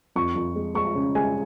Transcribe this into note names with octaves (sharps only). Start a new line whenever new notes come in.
F2 C#6
F2
G#3
G#3 C#6
C#3
G#3 G#5